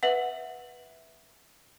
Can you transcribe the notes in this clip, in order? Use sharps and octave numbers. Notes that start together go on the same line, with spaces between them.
B4 E5 F#5